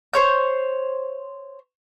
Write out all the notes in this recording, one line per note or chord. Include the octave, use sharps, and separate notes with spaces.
C5 C#5 G6